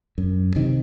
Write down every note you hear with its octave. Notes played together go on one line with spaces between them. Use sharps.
F#2
C3 D#3